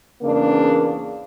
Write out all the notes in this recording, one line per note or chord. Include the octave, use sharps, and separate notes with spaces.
E2 C#3 A#3 D4